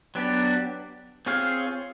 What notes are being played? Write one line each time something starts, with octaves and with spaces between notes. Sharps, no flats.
F#3 B3 D4 G4
C4 F4 G#4 C#5 F5